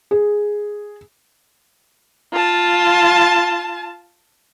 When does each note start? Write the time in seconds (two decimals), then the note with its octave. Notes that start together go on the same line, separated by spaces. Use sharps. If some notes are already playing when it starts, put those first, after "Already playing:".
0.11 G#4
2.33 F4 A5